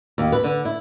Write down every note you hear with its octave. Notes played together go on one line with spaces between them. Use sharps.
D#2
B4
D3
E4